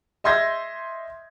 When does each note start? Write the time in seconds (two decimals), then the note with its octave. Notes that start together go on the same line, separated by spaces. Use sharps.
0.24 D#5 E5 C6 G6 G#6 A#6